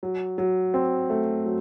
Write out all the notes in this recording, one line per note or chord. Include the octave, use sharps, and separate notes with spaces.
F#3
F#3
C4
A3
F#3